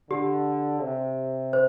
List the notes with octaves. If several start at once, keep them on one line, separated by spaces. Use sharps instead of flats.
D3 G4
C3
C5